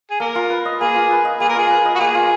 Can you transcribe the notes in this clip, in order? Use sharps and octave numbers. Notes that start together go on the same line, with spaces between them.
G#4
A#3 A#4
F4
B4
D#5
A#3 G#4
F4
B4
D#5
A#3 G#4
A#4
F4 G#4
B4
D#5
F#4
A#3 G#4
F4